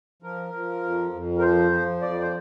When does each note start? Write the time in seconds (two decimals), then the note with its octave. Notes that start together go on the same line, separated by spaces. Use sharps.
0.23 F3 A#4
0.53 F3
0.83 F2
1.12 F2
1.38 A#4
1.42 F3 C5
1.72 F3
2.02 F2 D5
2.20 C5